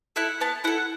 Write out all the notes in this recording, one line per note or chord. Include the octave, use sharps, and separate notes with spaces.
E4 A4 F#5
B3 A5
E4 A4 F#5